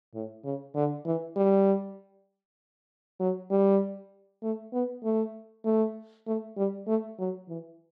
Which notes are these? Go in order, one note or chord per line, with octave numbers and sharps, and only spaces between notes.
A2
C#3
D3
E3
G3
F#3
G3
A3
B3
A3
A3
A3
G3
A3
F#3
E3